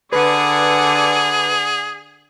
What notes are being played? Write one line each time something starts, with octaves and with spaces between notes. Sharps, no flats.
D3 G#4 B4 D5 F#5 G#5